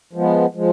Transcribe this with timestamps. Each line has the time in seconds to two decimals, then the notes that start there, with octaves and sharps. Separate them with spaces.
0.13 F3 G#3 B3
0.55 F3 G#3